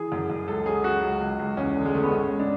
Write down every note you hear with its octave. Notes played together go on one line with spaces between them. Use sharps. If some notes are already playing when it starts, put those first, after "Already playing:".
Already playing: E3 G#4
F#2
F#2
C#2 A4
F#3 G#4
C#3 F#4
C#2
C#2
C#2
E2 C#4
D3
G#3
D3 A3
B3
G#2 C#4
G#2
D4